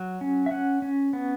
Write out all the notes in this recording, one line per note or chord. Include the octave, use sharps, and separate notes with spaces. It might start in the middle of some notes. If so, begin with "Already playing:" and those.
Already playing: F#3
C#4
E5
C#4 F#5
C#4
B3